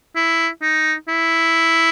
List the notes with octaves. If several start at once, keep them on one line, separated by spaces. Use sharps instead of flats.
E4
D#4
E4